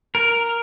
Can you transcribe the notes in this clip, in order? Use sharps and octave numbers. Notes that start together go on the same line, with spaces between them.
A#4